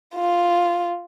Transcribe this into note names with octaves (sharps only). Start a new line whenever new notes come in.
F4